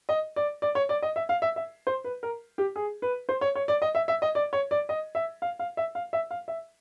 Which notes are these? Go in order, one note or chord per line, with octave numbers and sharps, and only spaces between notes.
D#5
D5
D5
C#5
D5
D#5
E5
F5
E5
E5
C5
B4
A#4
G4
G#4
B4
C5
C#5
C#5
D5
D#5
E5
E5
D#5
D5
C#5
D5
D#5
E5
F5
F5
E5
F5
E5
F5
E5